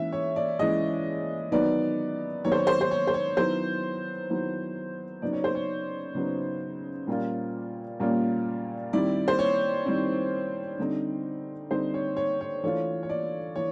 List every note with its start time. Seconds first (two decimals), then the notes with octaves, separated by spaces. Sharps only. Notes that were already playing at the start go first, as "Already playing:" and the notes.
Already playing: E3 G#3 C#4 E5
0.12 C#5
0.36 D5
0.59 E3 G#3 C#4 D#5
1.51 D#3 F#3 B3 D#4 D5
2.44 D#3 F#3 B3 D#4 C#5
2.52 C5
2.59 C#5
2.67 C5
2.81 C5
2.91 C#5
3.07 C5
3.14 C#5
3.37 D#3 F#3 B3 E4 C5
4.30 D#3 F#3 B3 E4
5.22 C#3 F#3 B3 D#4 D5
5.33 C#5
5.44 C5
5.55 C#5
6.15 C#3 F#3 B3 D#4
7.07 A#2 G3 A#3 C#4 F4
8.00 A#2 G3 A#3 C#4 F4
8.93 D#3 G3 C4 E4 D5
9.28 C5
9.39 C#5
9.86 D#3 G3 C4 E4
10.79 D3 G3 C4 D#4
11.71 D3 G3 C4 D#4 C5
11.94 C#5
12.17 C#5
12.41 C#5
12.64 E3 A3 D4 F4 C#5
13.03 C#5
13.09 D5
13.56 E3 C#5